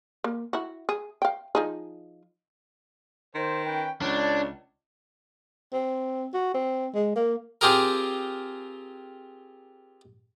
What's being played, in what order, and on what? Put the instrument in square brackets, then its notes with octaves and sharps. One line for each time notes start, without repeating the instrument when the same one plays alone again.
[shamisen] A#3
E4 F#4
G#4
F5 G5
F3 D#4 G#4
[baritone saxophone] D#3 [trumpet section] C5
[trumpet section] C#4 B4 G5
[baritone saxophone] C#2 [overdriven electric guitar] D4 [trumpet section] C#5
[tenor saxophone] C4
F#4
C4
G#3
A#3
[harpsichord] C4 F4 G4 G#4 A#4